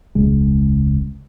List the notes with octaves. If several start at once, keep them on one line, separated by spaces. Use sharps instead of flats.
E1 C#2 C#3 G#3